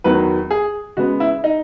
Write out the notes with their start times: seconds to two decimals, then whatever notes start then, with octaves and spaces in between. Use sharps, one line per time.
0.04 E2 D#3 F#3 B3 B4
0.51 G#4
0.97 C#3 G#3 B3 F#4
1.20 E4
1.44 D#4